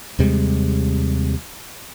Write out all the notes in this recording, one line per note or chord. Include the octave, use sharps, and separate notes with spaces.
D#2 C3 G3 G#3